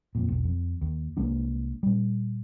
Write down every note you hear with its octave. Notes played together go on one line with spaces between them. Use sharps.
F2 A#2
E1 B1
F2
D#2
C2 G#3 A#3 D4
A#2 G3